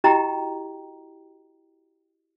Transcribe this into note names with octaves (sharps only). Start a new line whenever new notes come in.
E4 F#4 G4 D#5 G5 A#5